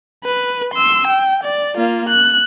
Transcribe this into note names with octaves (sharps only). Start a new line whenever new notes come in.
B4
C6 E6
G5
D5
A#3 F4
F#6